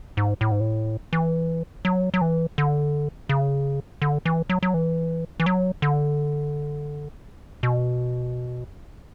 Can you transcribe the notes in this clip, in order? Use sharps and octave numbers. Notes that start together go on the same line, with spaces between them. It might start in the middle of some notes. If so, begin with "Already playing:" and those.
G#2
A2
G#2
A2
E3
F#3
F#3
E3
D3
C#3
D3
E3
F#3
F#3
E3
E3
F#3
D3
B2